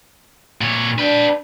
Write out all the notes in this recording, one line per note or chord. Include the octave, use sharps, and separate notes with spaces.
A#2 C#5
D4 B4 G5